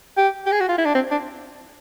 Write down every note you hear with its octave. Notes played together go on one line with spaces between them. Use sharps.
G4
G4
G#4
F#4
F4
E4
D4
C4
D4